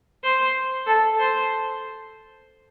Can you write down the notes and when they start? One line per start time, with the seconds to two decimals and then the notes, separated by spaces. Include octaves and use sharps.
0.23 C5
0.87 A4
1.19 C5